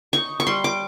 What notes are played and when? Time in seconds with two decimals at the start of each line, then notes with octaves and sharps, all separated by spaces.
0.13 D#4 C#6
0.40 C#6
0.47 G3 C6
0.64 D6